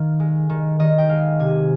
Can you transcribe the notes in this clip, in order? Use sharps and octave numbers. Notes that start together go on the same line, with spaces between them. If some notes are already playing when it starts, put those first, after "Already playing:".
Already playing: D#3 F5
G#3
D#3
D#3 D#5
G5
G#3 F5
C3 G#5